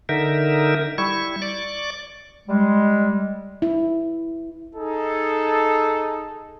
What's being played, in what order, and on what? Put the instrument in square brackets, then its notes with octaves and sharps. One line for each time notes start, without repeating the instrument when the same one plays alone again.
[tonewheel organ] D3 D#4 A#4 E5
G3 E4 C#6
D5 C#6 D6
[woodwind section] G3 G#3
[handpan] E4
[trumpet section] D#4 G#4 A4